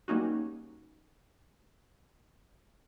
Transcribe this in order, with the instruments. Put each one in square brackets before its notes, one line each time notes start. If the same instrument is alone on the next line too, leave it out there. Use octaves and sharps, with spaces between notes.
[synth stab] G3 A#3 C#4 D#4 F#4